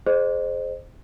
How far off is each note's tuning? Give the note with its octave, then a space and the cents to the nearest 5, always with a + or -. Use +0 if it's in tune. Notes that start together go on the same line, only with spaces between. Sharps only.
G#4 +30 C5 +0 D#5 -35